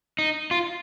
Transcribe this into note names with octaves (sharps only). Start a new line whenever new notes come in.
D#4
F4